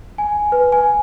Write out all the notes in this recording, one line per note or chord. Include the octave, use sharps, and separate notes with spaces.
G#5
B4
G#5